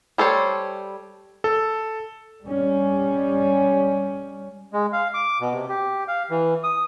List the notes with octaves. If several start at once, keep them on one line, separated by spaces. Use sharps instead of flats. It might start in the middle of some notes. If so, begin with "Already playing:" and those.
G3 A4 C5 C#5
A4
G3 C#4
G#3
F5
D6
B2
C3
G4
F5
E3
D#6